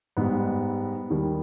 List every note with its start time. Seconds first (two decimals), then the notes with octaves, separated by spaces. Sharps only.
0.17 G#2 G3 B3
1.10 D#2 D#3 G3